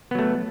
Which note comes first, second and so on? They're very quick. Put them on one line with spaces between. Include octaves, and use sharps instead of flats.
B3 F#3 A3